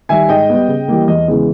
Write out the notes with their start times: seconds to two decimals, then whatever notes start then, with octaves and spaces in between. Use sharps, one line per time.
0.09 D#3 G3 E5 G#5
0.29 G#2 D#5 G5
0.50 G3 B3
0.68 C#3
0.88 E3 G3 A#3
1.08 E2 D#5
1.28 C#3 E3 G#3 B3